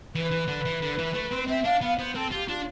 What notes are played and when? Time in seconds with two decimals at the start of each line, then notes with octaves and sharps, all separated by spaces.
0.15 E3 B4
0.31 E3
0.48 D3
0.65 E3
0.82 D3
0.99 E3
1.14 A3
1.32 C4
1.48 C4 E5
1.64 D4 F5
1.82 B3 F5
1.98 B3 C5
2.15 C4 A4
2.31 F4 G4
2.48 D4 F4